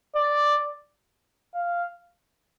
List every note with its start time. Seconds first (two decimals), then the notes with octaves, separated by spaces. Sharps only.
0.15 D5
1.54 F5